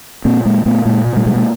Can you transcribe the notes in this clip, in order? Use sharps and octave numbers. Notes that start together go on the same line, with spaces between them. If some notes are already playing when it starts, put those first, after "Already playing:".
A#2 A#3 C4
A#2 G#3 A#3
A#2 A3 B3
A#2 G#3 A#3
B2
G3 A3
B2 F#3 G#3
G#3 A#3